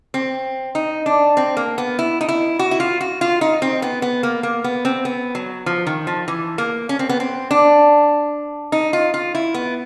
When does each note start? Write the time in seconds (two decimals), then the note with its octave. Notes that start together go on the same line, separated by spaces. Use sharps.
0.14 C4
0.75 D#4
1.06 D4
1.37 C4
1.57 A#3
1.78 B3
1.99 E4
2.21 D#4
2.29 E4
2.59 F#4
2.71 E4
2.80 F4
3.01 F#4
3.21 F4
3.41 D#4
3.62 C4
3.82 B3
4.02 B3
4.23 A#3
4.43 A#3
4.64 B3
4.85 C4
5.05 B3
5.35 F#3
5.66 F3
5.87 D#3
6.07 F3
6.28 E3
6.58 A#3
6.89 C#4
6.99 C4
7.09 B3
7.20 C4
7.51 D4
8.72 D#4
8.93 F4
9.14 F4
9.35 E4
9.54 B3